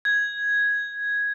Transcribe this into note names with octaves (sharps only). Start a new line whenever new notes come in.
G#6